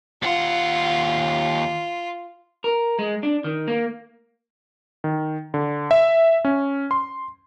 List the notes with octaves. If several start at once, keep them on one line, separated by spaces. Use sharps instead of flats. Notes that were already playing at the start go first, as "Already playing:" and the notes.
D#2 F4 F#5
A#4
G#3
D4
D#3
A#3
D#3
D3
E5
C#4
C6